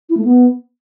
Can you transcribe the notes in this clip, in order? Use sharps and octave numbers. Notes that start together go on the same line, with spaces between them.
E4
A3
B3